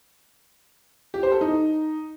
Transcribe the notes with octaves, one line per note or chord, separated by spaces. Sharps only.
G4
C5
A4
D#4